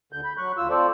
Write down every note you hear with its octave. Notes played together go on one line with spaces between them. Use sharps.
D2 D3 G6
B5
F#3 C#6 F#6
D2 F4 E6
C4 F4 A4 C5 D5